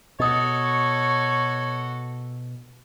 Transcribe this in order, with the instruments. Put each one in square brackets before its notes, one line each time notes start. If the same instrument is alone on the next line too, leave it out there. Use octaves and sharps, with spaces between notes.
[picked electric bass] B2 [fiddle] F#4 A4 [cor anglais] C#5 [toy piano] D#5 D#6